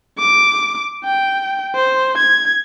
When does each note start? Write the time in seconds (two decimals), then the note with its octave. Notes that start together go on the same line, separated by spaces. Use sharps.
0.18 D6
1.04 G5
1.75 C5
2.17 G#6